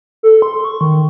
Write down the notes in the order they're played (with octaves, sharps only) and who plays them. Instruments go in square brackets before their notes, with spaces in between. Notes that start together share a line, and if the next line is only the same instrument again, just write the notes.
[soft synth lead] A4
C6
C#6
D#3